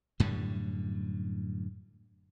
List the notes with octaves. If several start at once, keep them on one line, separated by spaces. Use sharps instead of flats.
F#2 A2 D3 G3